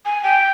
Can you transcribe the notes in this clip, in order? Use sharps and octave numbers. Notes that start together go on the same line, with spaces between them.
G#5
G5